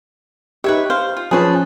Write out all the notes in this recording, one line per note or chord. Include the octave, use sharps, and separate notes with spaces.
D#4 G4 B4 C#5 E5
C5 F5
F4
F3 C#4 G#4 B4 A5